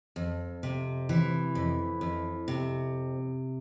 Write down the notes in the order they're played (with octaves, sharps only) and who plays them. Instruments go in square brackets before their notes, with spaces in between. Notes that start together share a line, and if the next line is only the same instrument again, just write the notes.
[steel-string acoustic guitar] F2
C3
E3
F2
F2
C3